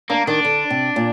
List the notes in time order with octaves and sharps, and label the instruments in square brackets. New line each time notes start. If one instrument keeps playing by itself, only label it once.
[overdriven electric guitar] A#3 [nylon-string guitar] D4
[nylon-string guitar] D#3 [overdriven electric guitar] D4
[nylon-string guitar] D3
C3
A#2